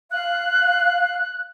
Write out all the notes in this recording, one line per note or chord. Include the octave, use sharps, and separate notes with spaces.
F5 F#6